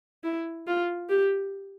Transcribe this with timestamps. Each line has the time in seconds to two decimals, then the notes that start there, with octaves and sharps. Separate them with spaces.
0.24 E4
0.67 F4
1.09 G4